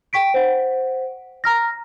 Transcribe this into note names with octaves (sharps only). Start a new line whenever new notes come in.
G5 C#6 B6 D7
C5 F#5
A#5 F6 A#6